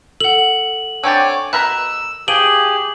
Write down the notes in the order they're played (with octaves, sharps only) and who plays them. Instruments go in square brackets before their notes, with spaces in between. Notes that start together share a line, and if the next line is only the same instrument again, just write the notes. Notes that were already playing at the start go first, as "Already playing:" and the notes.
[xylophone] A4 F#5 [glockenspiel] F#7
[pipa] D3 C4 G4 [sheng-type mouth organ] C#5 G#5 D6 [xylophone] E6 A6
[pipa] B2 A#4 B5 [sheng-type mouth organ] E6 [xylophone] F#6
[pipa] F3 [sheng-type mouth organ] G4 G#4 [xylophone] D7 D#7 G7 [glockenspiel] F#7